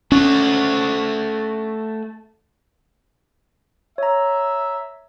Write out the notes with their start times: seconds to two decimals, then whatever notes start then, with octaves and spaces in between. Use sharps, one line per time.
0.12 A3 C#4 F#4
3.98 C#5 E5 A#5